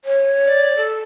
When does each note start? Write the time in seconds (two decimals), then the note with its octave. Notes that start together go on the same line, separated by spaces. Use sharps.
0.05 C#5
0.46 D5
0.77 A4